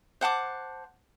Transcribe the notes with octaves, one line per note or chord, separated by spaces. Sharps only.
C5 F#5 A5 D6